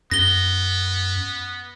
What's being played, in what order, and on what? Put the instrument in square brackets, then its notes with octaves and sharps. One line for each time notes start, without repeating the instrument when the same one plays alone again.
[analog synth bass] F#2 [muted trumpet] B3 [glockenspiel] A#6 G7